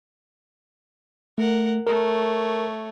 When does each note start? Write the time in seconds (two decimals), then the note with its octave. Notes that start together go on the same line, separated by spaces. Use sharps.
1.38 A3 A#4 F#5
1.87 A3 A#4 C#5